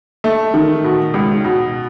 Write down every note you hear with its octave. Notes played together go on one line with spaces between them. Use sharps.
A3
D#3
B2
C#2
B2